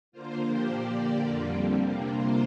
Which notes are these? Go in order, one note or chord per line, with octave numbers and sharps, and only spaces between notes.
D3 A#3 F4 C5
F3 A#3 D4 G4 C5
A#2 A#3 G4 D5
D3 A#3 G4 D5
F2 D3 G3 A#3 F4
D3 G3 C4
C3 G3 A#3 D4
C3 A#3 F4 C5